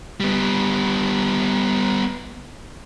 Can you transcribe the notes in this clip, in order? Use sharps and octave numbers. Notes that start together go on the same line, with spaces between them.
G3 B3